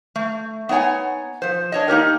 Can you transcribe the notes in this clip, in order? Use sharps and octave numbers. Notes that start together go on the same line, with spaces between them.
A3
B3 D#4 C#5 F#5 G#5
F3 C5
D4 C#5 D#5
A#3 D#4 G4 A#4